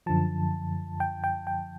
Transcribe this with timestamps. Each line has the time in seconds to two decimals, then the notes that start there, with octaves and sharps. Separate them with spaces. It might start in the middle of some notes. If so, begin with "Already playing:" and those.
0.06 F#2 D3 F3 A5
1.00 G5
1.24 G5
1.47 G5